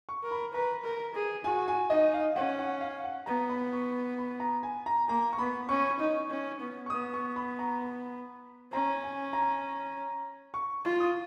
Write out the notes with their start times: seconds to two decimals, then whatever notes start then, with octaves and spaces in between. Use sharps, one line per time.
0.09 C#6
0.24 A#4
0.31 B5
0.54 B4 A#5
0.84 A#4
1.15 G#4
1.44 F#4 G#5
1.68 G#5
1.90 D#4 D#5
2.14 F5
2.36 C#4 F#5
2.59 F#5
2.81 F5
3.04 F#5
3.26 B3 A#5
3.49 B5
3.73 C#6
4.18 B5
4.40 A#5
4.63 G#5
4.86 A#5
5.09 A#3 A#5
5.33 C#6
5.38 B3 B5
5.69 C#4 C#6
6.00 D#4
6.31 C#4
6.60 B3
6.86 C#6
6.90 B3 D#6
7.14 C#6
7.36 B5
7.59 A#5
7.81 B5
8.73 C#4 A#5
9.03 G#5
9.33 A#5
10.54 C#6
10.85 F4
11.00 D#6